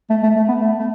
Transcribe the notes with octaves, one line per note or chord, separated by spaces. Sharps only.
A3
A3
A3
B3
A3
A3